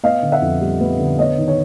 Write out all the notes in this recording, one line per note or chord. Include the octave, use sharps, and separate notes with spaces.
B3 D#5 F5
D3
E5 F#5
F2
G3
B3
D3
B3 C#5 D#5
D#3
C#5